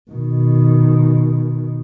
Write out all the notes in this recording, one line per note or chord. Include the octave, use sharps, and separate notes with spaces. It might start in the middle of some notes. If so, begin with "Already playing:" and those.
B2 D#3